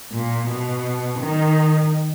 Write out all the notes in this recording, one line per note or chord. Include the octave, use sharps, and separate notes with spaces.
A#2
B2
D#3